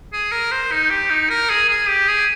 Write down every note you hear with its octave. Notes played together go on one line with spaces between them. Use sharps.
G#4
A#4
C5
D#4
G4
D#4
A#4
G#4
G#4
G4
G#4